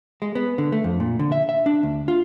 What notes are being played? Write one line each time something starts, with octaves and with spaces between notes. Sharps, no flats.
G#3
B3
D3
A3
F2
A#2
D3
E5
E5
D4
D2
F4